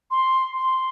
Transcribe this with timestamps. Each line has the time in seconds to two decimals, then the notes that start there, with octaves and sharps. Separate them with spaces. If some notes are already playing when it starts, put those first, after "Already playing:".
0.11 C6
0.58 C6